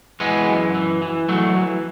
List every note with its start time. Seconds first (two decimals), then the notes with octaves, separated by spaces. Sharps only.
0.20 E3 G#3 B3
0.47 F#2
0.74 E3
1.02 E3
1.29 E3 F#3 A3
1.56 E3